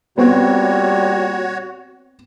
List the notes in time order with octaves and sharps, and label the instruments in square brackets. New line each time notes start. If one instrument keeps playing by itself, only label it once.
[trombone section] A#2 G3 [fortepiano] B3 C4 [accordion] F#4 C#5